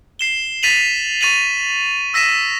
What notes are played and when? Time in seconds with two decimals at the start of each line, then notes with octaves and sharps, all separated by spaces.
0.19 C7 E7 G7
0.63 A6 B6 D#7 F7 F#7
1.21 C#6 A6 D#7 F7 F#7
2.13 D#6 E6 A#6 B6 D#7 E7